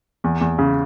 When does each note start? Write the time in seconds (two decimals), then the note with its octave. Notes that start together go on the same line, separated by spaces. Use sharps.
0.24 E2
0.41 E2
0.59 C#3